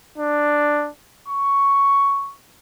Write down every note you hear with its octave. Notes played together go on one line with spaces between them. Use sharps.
D4
C#6